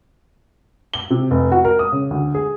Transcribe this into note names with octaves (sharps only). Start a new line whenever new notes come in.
G7
C3
F1
F#4
A#4
D#6
C#3
D2
G#4